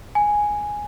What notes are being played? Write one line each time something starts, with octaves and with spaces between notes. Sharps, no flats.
G#5